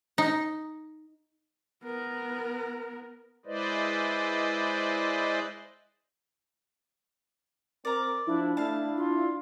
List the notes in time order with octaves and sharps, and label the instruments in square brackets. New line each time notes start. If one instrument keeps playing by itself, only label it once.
[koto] D#4
[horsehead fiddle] B3 A#4
[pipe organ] G#3 E4 B4 C5 D5 D#5
[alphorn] C4 [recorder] A#4 [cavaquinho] D5 A#5
[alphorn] F3 [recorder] D4 [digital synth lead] E4
[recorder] A3 [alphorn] D4 [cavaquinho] F5 A5
[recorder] F4